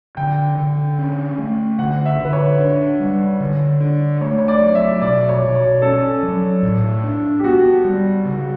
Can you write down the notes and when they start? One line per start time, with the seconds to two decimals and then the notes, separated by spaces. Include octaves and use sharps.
0.17 D3 G5
0.58 D3
0.98 C#4
1.38 A3
1.79 D3 F#5
2.06 E5
2.19 D3
2.25 B4
2.33 C#5
2.59 D4
3.00 G3
3.40 D3
3.80 D4
4.21 A3 C#5
4.38 C#5
4.48 D5
4.61 F#3
4.75 E5
5.02 B2 D5
5.29 C#5
5.42 B2
5.55 C#5
5.82 C#4 A4
6.23 F#3
6.63 A2
7.04 D4
7.40 G4
7.44 B3 F#4
7.85 G3
8.24 C#3